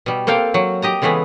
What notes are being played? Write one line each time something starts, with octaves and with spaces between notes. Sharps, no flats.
B2 G3
A#3 C4 A4 F5 G5
F#3
G4 D#5 A#5
C#3 E3 G#3 A3 B3